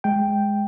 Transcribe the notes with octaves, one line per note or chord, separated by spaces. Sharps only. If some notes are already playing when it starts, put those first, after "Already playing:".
G#3 G5